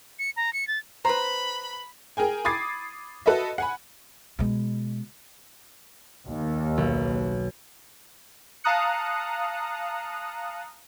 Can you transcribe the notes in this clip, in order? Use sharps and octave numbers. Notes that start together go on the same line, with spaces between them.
C#7
A#5
C#7
A6
B4 C5 A#5 B5
G#4 A#4 G5 G#5
B5 D6 D#6 G#6 A6 C7
F#4 A4 B4 D#5 E5
F#5 G#5 B5
B2 G#3
D#2
B1
F5 A5 A#5 D#6 F#6 C#7